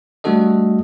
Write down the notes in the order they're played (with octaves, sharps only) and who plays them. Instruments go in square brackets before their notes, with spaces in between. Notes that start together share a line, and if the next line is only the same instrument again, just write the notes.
[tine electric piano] G3 A3 D4 F#4 A4 D#5